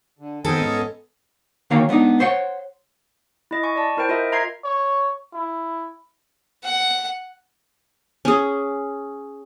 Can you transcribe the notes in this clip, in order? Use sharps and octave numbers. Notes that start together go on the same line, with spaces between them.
D3
D#3 B3 C4 A4 D#5 G#5
G#2 C#4
D2 D#3 A#3 C#5 F5 A#5
G#3 B3 D4 D#4
C5 C#5 F#5
E4 D#5
G#5 C#6
D5 A5
E4 A#4 C5 G5
F4 A#4 D#5 E5
E5 A#5 C6 G#6 C7
C#5
E4
F#5
C#4 G#4